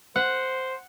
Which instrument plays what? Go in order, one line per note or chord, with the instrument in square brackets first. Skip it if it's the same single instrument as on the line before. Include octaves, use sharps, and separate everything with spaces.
[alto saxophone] C5 [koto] F#5